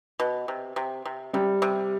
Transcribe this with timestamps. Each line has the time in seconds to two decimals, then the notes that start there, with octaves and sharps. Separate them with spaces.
0.20 B2
0.48 C3
0.76 C3
1.05 C3
1.33 C3 G3
1.62 C3